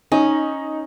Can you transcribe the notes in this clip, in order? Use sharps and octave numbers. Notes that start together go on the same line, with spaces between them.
C#4 D#4